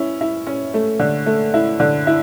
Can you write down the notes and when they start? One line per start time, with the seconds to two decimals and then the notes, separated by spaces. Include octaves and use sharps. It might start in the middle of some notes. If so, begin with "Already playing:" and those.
Already playing: C#4 E4
0.21 E4
0.47 C#4
0.74 A3
1.00 D3
1.26 A3
1.54 E4
1.80 D3
2.07 E4